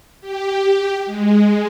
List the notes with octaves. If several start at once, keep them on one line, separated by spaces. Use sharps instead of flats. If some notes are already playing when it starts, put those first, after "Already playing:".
G4
G#3